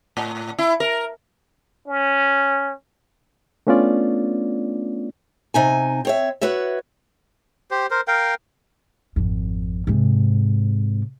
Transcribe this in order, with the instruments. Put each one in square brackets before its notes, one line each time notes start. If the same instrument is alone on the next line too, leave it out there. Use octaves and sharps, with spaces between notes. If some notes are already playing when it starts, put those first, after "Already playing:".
[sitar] A2
E4
A#4
[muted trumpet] C#4
[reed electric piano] A3 B3 C#4 D4 F4 D5
[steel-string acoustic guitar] C3 D#4 G#5
C4 C#5 E5
F#4 B4 C#5 E5
[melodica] G4 C5
A#4 C5
A#4 F5 G5
[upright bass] G#1 F2
G#2 C3